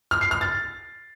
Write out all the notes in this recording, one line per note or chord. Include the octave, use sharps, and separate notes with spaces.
F6
C7
F6
A6